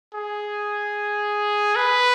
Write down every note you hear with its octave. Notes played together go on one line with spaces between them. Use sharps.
G#4
B4